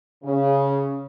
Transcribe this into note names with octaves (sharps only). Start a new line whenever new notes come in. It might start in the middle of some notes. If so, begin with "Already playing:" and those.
C#3